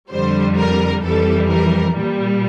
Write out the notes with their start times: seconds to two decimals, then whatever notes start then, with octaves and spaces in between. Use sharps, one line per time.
0.10 F2 D3 G3 C5
0.57 A#4
1.03 F2 E3 G3 A4
1.50 A#4
1.95 A#2 G3